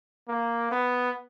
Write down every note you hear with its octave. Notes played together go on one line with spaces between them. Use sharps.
A#3
B3